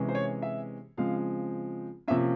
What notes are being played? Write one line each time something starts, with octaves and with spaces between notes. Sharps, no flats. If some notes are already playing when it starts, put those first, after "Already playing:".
Already playing: C3 E3 G#3 C#4
C5
C#5
E5
C#3 F3 G#3 C4 F5
C3 F3 A#3 C#4 E5